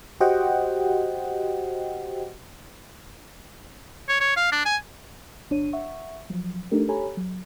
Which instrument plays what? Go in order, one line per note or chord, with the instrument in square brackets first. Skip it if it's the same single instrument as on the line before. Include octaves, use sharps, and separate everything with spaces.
[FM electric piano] F#4 G4 C5 D#5 F#5 G5
[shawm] C#5
C#5
F5
D4
G#5
[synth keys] G1 D4 C#5 D#7
E5 F#5 C#6
F3 F#3
A3 D4 D#4 G4 A4 A#4
G4 A4 C#5 G#5 A#5 B5
F#3